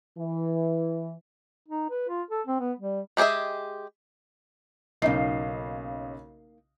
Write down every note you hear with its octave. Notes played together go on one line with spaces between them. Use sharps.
E3
D#4
B4
F4
A4
C4
B3
G3
G#3 G4 G#4 D#5 E5
B1 C#3 A#3 D#4 D#5 C7